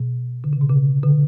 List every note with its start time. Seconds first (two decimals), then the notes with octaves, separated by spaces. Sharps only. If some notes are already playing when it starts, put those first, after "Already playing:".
Already playing: B2
0.44 D3
0.53 C#3
0.61 B2
0.69 C#3
1.03 D3